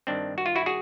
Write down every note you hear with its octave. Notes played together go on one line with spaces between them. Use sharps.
G2 D#3 C4 D4
F#4
F4
E4 F#4
F#4 G#4